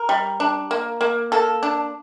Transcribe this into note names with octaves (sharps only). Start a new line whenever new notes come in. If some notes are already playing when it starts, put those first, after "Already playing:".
Already playing: A#4
G3
D4
A#3
A#3
A#3 A4
D4